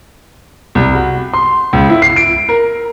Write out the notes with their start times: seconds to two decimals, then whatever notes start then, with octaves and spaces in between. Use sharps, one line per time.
0.75 C2
0.95 F#4
1.34 C6
1.73 C#2
1.89 E4
2.02 C7
2.16 D7
2.49 A#4